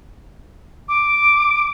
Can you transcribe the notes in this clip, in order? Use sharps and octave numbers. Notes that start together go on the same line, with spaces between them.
D6